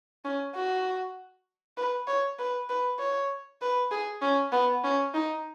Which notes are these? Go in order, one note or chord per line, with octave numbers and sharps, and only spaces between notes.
C#4
F#4
B4
C#5
B4
B4
C#5
B4
G#4
C#4
B3
C#4
D#4